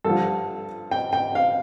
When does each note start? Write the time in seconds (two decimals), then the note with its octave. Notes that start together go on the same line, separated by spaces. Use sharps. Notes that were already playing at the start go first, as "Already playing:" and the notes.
0.04 G2 D3 F3 A4
0.91 G5
1.13 G5
1.35 F5